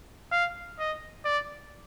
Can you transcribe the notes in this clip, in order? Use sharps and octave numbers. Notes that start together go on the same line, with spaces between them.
F5
D#5
D5